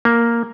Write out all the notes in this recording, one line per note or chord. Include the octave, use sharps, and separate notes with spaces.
A#3